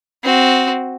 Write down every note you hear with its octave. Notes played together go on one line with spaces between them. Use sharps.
C4 F#4